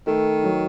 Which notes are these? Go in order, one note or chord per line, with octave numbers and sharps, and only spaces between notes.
D#3 A3
F#3